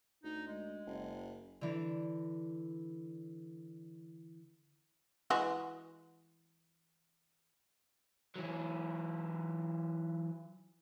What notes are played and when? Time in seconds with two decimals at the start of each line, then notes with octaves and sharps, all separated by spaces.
0.24 D2 D#4
0.48 G#3
0.87 F#1
1.61 D3 E3
5.30 E3 G#3 F#4
8.35 E3 F#3